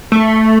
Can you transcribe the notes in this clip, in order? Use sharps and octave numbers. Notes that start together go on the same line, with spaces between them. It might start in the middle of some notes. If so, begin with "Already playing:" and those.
A3